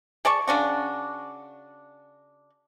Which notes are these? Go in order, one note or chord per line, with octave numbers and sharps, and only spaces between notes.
G#4 D5 A5 C#6
C#3 D4 F#4